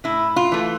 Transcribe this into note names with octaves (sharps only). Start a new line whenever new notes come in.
A2 E4
F4
E3 A3